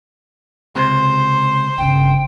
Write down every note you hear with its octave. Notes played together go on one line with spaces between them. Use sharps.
C#2 C3 C5
G1 C#3 G5